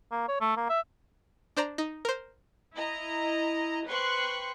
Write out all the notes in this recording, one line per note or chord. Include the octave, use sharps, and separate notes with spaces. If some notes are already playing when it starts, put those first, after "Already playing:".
A#3
C#5
A3
A#3
E5
D4 C5 D5 A#5
D#4
A#4 C5
E4 D#5 A#5
B4 C5 G5 C6 C#6 F#6